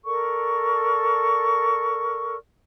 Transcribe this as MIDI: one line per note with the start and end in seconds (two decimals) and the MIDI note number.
0.05 2.37 69
0.05 2.37 70
0.05 2.37 74
0.05 2.37 85